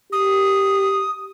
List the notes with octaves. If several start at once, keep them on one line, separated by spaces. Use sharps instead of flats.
G4 D#6